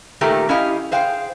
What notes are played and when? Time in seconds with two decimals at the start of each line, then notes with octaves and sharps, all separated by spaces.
0.21 A#2 D#3 A3 G4 A#4
0.49 C#4 E4 G4 D#5 F5
0.92 G#4 C5 F5 G5